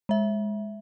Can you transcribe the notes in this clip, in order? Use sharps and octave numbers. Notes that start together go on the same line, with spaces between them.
G#3 E5